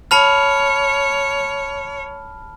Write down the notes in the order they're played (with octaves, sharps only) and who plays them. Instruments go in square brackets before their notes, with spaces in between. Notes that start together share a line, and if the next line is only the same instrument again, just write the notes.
[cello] C#5 [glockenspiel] A5 B5 F6